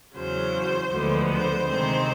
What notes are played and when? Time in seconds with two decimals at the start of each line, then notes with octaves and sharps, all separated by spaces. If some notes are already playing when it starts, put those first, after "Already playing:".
0.17 E2 C#3 F#3 C5
0.93 D2 D3 F3 G#3 B3
1.31 C5
1.69 C3 D#3 G#3 C4 C5